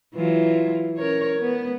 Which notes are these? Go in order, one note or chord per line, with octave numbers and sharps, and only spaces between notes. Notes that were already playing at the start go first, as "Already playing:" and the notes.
E3 F#3 F4
C#4 A#4 C#5
B3